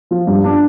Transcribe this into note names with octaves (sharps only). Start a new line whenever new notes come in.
F3
G2
D4